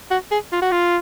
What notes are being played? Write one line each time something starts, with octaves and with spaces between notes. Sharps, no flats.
F#4
G#4
F4
F#4
F4